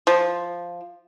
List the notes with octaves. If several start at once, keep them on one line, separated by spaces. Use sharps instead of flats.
F3